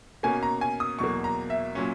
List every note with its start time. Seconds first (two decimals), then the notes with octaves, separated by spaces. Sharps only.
0.23 B2 A#3 C#4 G#5
0.43 A#5
0.61 G#5
0.80 D#6
0.99 E2 B2 F#3 A#3 C#6
1.24 A#5
1.50 E5
1.75 A#2 F#3 C#4